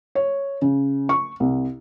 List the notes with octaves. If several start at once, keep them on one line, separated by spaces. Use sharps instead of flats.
C#5
C#3
C#6
C2